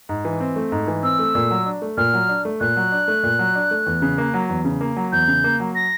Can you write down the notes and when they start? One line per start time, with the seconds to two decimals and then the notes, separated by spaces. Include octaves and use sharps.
0.09 G#2
0.25 E3
0.40 C4
0.56 A3
0.72 G#2
0.88 E3
1.03 C4 E6
1.19 A3
1.35 A#2
1.51 F#3
1.66 D4
1.82 A3
1.97 A#2 F6
2.14 F#3
2.29 D4
2.45 A3
2.61 A#2 F#6
2.76 F#3
2.92 D4
3.08 A3
3.23 A#2
3.39 F#3
3.55 D4
3.71 A3
3.87 E2
4.02 C#3
4.18 A#3
4.34 F#3
4.49 E2
4.65 C#3
4.81 A#3
4.97 F#3
5.12 E2 G6
5.28 C#3
5.44 A#3
5.60 F#3
5.75 A#6